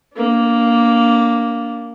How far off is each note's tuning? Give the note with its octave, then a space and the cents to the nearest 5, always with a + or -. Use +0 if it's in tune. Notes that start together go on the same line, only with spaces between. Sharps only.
A#3 +0 D4 -25